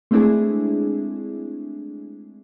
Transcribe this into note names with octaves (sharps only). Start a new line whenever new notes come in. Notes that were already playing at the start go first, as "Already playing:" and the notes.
G#3 A3 C4 D4 E4 G#4